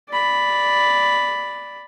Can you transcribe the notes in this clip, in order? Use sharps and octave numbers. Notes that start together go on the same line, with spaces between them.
D5 B5